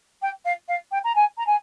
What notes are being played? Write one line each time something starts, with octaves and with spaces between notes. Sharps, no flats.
G5
F5
F5
G5
A#5
G#5
A#5
G#5